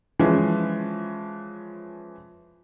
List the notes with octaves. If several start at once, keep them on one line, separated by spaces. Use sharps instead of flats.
E3 F3 G#3 C#4